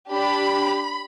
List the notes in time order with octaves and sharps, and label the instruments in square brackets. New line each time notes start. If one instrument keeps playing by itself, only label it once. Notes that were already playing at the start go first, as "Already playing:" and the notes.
[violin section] D4 G4 B5